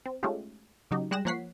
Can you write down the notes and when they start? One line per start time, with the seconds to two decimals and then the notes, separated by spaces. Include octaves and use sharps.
0.06 C4
0.23 G#3 A3 C#4 D#4 F4 G4
0.91 C#3 F#3 D#4 G4
1.11 G3 G#3 G5 F#6 A#6 E7
1.25 F3 A#3 C#5 F#5 B6 C7